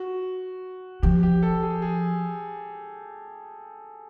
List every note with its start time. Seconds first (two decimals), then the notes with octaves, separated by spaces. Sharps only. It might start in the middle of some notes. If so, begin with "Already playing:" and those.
Already playing: F#4
1.02 F3 G4
1.23 G4
1.43 A4
1.62 G#4
1.82 G#4